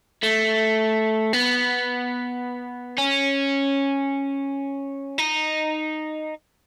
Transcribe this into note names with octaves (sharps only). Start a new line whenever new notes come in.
A3
B3
C#4
D#4